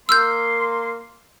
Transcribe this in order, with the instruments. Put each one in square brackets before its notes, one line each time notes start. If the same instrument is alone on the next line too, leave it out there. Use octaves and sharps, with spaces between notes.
[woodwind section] A#3 C6 [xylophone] E6 F6 G6